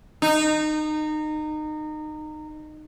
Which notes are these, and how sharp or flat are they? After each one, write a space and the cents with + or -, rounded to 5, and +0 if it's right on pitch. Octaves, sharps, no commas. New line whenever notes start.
D#4 -25